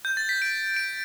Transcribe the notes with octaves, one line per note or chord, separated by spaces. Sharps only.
G6
A6
B6
D7
D7